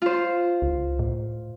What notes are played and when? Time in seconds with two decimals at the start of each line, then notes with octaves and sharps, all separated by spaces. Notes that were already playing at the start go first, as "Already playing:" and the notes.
0.02 F4 C5
0.62 C#2
0.99 A2